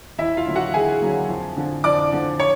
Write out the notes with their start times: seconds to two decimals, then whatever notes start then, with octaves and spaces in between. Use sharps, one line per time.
0.18 D#2 E4 E5
0.37 F4 F5
0.46 D3 F#3 A#3
0.55 F#4 F#5
0.73 D#2 G#4 G#5
1.02 D3 F#3 A#3
1.29 F2
1.57 D3 F3
1.84 F2 D5 D6
2.12 D3 F3
2.39 C#5 C#6